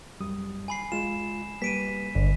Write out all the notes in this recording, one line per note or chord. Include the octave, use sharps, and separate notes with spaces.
F#2 G3 D#6
G#5 B5 C7
G#3 F4 E7
G3 A#3 B4 B6 D7 D#7
G1 D3